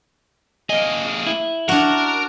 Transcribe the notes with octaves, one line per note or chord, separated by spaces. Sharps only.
A#3 G#4 D#5
E4
D4 F#4 A#4